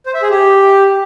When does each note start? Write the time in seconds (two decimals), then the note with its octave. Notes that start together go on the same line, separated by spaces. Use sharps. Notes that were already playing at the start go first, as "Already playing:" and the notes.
0.06 C5
0.14 E5
0.22 G#4
0.30 G4